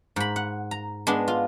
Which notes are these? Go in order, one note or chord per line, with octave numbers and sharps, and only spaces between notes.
G#2 B5
F#5
A#5
G#3 B3 D4
F4